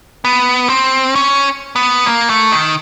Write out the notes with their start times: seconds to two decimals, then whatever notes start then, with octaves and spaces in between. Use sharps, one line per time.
0.25 B3
0.69 C4
1.15 C#4
1.76 B3
2.06 A#3
2.30 A3
2.52 D#3